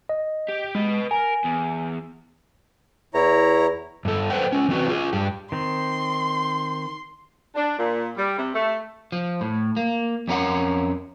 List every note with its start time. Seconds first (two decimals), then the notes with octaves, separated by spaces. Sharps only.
0.09 D#5
0.48 G4
0.75 G#3 B4 D#5
1.11 A#4 G#5
1.44 E2
3.14 E2 E4 C#5 A#5
4.05 G2 A4
4.30 A4 B4 C5 F#5 G5
4.53 G#3 C#4
4.69 E3 C4 F#4 B4
4.87 F4 G#4
5.13 G2 G4
5.52 D#3 C4 C6
7.55 D4
7.79 A#2
8.17 G3
8.38 C3
8.54 A3
9.12 F3
9.41 A2
9.77 A#3
10.28 F2 C#4 A#4 F#5